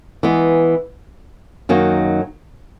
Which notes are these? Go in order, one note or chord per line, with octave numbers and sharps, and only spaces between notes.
E3 G#3 B3
F#2 D#3 F#3 A#3 D#4